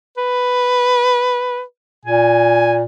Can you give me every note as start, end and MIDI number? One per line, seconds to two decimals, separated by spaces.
0.17 1.62 71
2.05 2.83 46
2.05 2.75 80